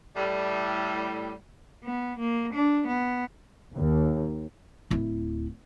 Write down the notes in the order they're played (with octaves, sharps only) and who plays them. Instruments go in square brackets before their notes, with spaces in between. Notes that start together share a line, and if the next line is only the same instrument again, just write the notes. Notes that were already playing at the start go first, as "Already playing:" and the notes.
[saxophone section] A2 G3
[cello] B3
A#3
D4
B3
[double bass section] D#2
[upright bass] D1 E4